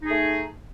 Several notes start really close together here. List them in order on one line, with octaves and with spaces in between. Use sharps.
D#4 G#4 A3